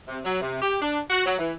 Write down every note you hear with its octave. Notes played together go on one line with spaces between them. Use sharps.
C3
F#3
C3
G4
D4
F#4
F#3
E3